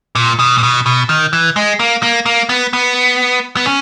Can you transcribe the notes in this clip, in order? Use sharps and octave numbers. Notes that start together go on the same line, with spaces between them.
A#2
B2
A#2
B2
B2
D#3
E3
G#3
A#3
A#3
A#3
B3
B3
B3
C#4